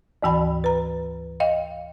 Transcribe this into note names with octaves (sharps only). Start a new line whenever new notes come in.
D2 G#2 E3 G5 B5
B4 A#5
D#5 F5 G5